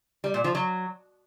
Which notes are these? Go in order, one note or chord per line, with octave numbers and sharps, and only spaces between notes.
G3
A#2
F3
F#3